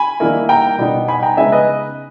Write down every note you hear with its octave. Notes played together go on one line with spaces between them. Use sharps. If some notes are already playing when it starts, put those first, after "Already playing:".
Already playing: G#5 B5
D#3 G3 A#3 E4
G5 A#5
B2 G3 B3 D#4
G#5 B5
G5 A#5
C#3 G#3 B3 D#4 E5 G#5
B4 D#5